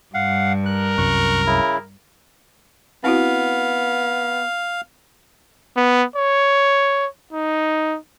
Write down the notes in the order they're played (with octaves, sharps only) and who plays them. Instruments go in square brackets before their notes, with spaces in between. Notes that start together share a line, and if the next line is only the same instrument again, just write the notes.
[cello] G2 [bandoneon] F5 F#5
[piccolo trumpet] A#4 [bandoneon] F#6
[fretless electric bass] C2 F#2 [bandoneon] C#6 F#6
[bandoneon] C#3 E4
[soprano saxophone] B3 [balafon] C4 E4 F#4 [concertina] F5
[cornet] B3
C#5
D#4